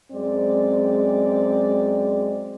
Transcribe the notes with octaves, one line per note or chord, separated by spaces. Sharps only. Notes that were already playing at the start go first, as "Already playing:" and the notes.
F#2 G#3 C4 D5